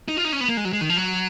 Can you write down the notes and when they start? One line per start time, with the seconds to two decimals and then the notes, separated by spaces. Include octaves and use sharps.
0.08 D#4
0.17 F4
0.25 D#4
0.32 C#4
0.41 B3
0.49 A#3
0.57 G#3
0.65 F#3
0.73 G#3
0.81 D#3
0.89 F3
0.97 F#3